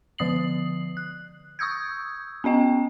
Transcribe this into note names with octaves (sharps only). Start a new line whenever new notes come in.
D3 F3 D#6 C7 F#7
F#6
C#6 D#6 E6 G6 G#6
B3 C#4 D#5 G5